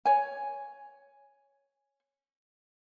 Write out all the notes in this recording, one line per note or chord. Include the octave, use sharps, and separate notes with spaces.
C#5 G#5